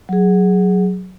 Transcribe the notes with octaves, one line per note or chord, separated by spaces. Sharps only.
F#3 G#4